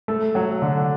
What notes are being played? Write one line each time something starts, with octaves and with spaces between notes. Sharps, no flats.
A3
F#3
D3